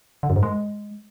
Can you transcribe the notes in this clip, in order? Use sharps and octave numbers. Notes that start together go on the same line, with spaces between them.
D3
F#2
G#2
G#3